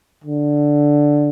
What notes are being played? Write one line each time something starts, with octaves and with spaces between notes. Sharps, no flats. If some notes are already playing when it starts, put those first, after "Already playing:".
D3